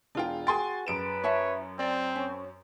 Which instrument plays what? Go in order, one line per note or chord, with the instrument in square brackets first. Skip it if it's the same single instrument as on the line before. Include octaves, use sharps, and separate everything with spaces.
[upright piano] E1 F4 [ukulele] D4 G#4 G5
[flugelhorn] F#4 [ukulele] G#4 G5 [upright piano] G#5 C6 A6
[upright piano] F#2 D7 E7 [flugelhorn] B4
[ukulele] E4 E5 A5 [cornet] C#5
[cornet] C4 [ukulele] D5
[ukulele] C#4 [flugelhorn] C#5